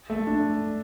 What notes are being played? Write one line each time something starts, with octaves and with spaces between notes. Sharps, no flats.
A3
D4